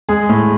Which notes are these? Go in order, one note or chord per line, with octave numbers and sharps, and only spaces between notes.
G#3 G#4
A2